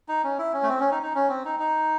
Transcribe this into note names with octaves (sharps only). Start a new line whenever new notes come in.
D#4
C#4
E4
C#4
A3
C4
C#4
D#4
D#4
C#4
C4
D#4
D#4